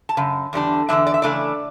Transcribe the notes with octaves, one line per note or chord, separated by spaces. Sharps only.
A5
F#2 C#3
E2 D3 G3 D4
E2 D3 G3 D4 E5
D5
E5
C#3 E3 A3 D4 D5